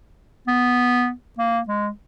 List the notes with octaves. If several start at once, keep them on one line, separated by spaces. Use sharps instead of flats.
B3
A#3
G#3